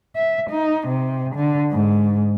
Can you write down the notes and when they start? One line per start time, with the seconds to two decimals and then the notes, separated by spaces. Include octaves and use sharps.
0.16 E5
0.51 D#4
0.88 C3
1.36 D3
1.72 G#2